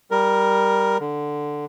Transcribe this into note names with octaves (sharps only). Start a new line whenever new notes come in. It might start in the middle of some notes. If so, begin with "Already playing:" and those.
G3 A#4
D3